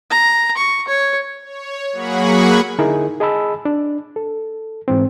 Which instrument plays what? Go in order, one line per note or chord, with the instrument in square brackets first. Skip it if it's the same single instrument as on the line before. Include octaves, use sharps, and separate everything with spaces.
[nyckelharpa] A#5
C#6
C#5
[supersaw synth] C#5
F#3 A#3 G#4 F#5 B5 C#6
[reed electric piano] D3 D#4 E4 G#4 A#4
G#4 D#5 A5 B5 E6
D4
A4
G#2 E3 C4